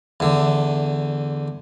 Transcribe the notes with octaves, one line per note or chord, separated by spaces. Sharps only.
E2 D3